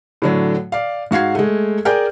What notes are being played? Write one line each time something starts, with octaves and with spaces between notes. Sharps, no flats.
A2 D3 F#3
D5 F5
G#2 F#4 F5 G#6 C7
G#3 A3
G#4 A#4 D5 G5 G#5 G6